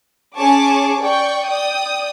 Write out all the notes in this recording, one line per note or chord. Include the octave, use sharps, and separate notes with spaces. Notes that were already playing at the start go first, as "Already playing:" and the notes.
C#4 G#4 A5 C#6 D6
D5 G5 C#6
D5 G5 D#6